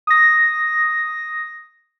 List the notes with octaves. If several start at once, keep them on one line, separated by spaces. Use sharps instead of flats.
D#6 A#6